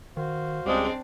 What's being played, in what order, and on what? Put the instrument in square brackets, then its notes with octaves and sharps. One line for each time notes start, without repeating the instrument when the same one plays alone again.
[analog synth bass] D#3 [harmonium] F#4 C5 F5
[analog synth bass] C#2 [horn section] C#3 G3 G#3 [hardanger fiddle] C4 D4